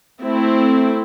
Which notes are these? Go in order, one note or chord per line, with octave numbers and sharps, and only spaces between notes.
A3 C4 E4